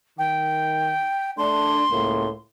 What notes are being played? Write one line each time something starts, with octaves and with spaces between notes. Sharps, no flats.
D#3 G5
A3 D4 C6
C#2 A2 A#3